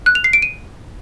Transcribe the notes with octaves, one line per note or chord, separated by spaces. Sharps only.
F#6
F7
C7
D7
D#7